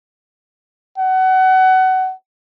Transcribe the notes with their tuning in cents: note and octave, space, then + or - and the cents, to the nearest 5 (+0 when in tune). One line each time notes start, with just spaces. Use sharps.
F#5 +25